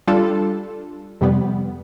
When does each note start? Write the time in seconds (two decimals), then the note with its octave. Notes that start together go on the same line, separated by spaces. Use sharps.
0.07 G3 D4 F4 A4
1.21 F2 C3 G3 B3